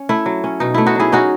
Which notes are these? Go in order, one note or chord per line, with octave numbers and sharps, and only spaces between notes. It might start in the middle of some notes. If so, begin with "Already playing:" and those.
Already playing: C#4
A3 E4
F#3
C#4
B2 D#4
A3 E4
D#4 F#4
F#3 E4 G#4
C#4 D#4 F#4